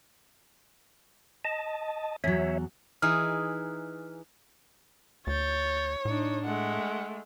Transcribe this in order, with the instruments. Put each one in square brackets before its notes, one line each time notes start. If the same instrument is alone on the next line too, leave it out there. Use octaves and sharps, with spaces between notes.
[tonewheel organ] D#5 A5
[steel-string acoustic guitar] E2 F#3 [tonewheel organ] C#5 E5
[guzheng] E3 D#4 G#4 [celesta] F6
[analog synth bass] D2 [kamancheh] C#5 [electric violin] G6 A6
[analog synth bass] A2 [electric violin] D4 D#4
[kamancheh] G#3 A3 [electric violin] F#5